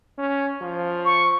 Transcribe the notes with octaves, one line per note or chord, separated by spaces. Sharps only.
C#4
F3
C#6